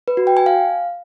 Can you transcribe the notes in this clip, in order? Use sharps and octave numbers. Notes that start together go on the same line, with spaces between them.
B4
F#4
G5
G#5
F5